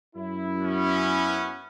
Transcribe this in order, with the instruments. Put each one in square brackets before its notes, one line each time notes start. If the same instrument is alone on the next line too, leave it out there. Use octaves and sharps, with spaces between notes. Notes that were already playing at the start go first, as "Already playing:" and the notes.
[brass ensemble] F#2 E4
[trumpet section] B3 C#4